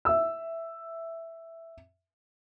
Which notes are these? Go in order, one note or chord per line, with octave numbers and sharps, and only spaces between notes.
E5 E6